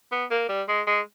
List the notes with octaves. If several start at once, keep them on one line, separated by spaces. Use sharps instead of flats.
B3
A#3
G3
G#3
G#3